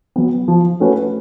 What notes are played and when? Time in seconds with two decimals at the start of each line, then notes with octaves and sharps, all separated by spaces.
0.16 F#3 B3
0.48 F3
0.80 A3 C#4 F#4 B4